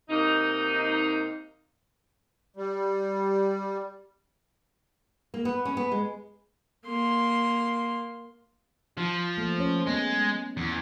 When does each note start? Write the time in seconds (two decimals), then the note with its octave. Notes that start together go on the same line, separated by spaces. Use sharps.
0.10 C3 A#3 D#4
2.57 G3
5.34 A#3
5.45 B3
5.65 C#4
5.77 B3
5.92 G#3
6.86 A#3 C6
8.97 F3
9.38 A3 A#3
9.59 C#4 C#5
9.86 F#3 G#3 B3
10.57 E2